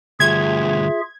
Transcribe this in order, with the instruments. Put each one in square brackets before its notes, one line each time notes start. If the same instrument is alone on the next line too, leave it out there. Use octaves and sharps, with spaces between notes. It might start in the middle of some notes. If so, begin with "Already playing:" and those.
[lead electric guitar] D2 G2 [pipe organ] F4 G#4 E5 [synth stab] G#6